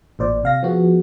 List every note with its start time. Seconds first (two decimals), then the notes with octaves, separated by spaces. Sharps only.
0.19 A1 A#2 C5 D5
0.43 C3 F5 A#6
0.63 F3 B3 F#4 G#4